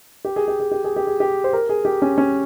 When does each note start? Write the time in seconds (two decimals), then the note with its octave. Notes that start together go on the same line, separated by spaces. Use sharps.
0.25 G4
0.36 G#4
0.48 G4
0.60 G#4
0.71 G4
0.84 G#4
0.96 G4
1.07 G#4
1.20 G4
1.44 C5
1.53 A#4
1.69 G#4
1.85 G4
2.02 C#4
2.18 C#4